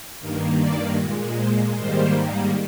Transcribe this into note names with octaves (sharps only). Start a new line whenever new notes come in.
G2 D#3 A#3
D5
A#2 G#3
C5
G#2 D#3 G3 A#3 C5